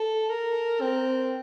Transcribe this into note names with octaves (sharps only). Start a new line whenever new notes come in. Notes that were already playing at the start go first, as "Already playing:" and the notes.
Already playing: A4
A#4
C4